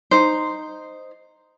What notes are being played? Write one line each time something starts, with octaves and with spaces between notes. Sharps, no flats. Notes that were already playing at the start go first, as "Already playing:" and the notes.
D#4 C5